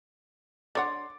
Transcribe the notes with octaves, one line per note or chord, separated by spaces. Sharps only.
D3 C#5 F#5 C6 D6 A6